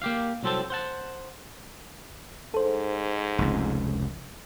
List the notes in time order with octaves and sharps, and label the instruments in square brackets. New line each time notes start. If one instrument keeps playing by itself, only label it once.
[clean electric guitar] A#3 G4 F5
C2 F#3 C4 A4 C5 A5
C5 F#5 A5
[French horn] G#2 [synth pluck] A4 C5
[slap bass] F1 C#2